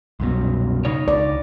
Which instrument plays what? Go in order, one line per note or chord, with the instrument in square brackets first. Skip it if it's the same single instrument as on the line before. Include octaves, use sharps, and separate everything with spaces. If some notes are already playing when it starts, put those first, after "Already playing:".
[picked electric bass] C2 F#2 B2
[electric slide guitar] C#3 D#4 C#5
[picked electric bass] C#2 [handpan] D5